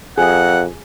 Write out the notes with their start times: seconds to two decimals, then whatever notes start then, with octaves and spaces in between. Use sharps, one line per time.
0.18 F2 G#4 F#5